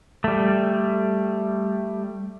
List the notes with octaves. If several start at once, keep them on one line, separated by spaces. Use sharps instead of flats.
G3 A3